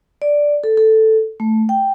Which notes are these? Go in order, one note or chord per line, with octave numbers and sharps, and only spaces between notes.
D5
A4
A4
A3
G5